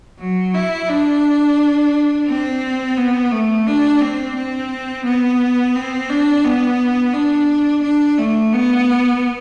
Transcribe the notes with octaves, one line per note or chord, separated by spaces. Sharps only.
F#3
E4
D4
C4
B3
A3
D4
C4
C4
B3
C4
D4
B3
D4
D4
A3
B3